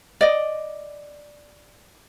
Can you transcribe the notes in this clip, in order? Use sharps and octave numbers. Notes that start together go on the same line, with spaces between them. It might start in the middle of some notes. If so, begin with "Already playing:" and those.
D5 D#5